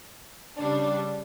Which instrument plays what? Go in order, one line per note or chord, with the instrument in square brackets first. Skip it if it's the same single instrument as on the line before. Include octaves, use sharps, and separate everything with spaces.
[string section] C#3 G3 D4